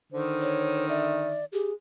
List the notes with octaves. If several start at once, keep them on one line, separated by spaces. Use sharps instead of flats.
D3 D#3 C5
C#5
D5 E5
G4 G#4